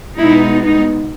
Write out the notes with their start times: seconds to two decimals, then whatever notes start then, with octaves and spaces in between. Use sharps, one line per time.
0.18 B2 G#3 B3 D#4 E4
0.64 D#4